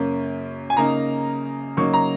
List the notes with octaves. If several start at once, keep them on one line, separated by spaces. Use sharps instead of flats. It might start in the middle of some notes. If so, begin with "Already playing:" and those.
Already playing: F#2 C#3 A#3 C#4
G#5
C#3 A#3 D#4 A#5
C#3 F#3 A#3 D#4 C#6
A#5